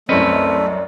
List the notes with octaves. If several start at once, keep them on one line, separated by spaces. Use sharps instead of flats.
C2 F#2 A3 C4 C#4 B4 D5 D#5